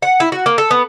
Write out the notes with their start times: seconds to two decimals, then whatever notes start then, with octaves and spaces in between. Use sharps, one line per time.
0.02 F#5
0.20 E4
0.32 F#4
0.46 A#3
0.58 A4
0.71 B3